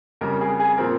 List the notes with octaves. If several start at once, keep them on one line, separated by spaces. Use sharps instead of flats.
F2 C#3 G3 A#4
G#4
G#4
A#2 F3 C4 A#4